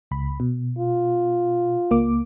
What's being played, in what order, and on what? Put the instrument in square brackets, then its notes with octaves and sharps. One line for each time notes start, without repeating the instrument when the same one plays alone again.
[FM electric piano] C#2 B5
B2
[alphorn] F4
[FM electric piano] C#2 A#3 D6